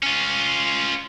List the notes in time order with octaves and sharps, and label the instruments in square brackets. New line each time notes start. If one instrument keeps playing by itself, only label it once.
[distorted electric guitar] C#4 F4